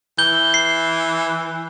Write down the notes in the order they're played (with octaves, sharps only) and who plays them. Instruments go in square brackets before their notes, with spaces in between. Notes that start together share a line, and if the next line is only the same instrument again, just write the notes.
[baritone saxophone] E3 [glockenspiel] G6 G7
[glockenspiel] C7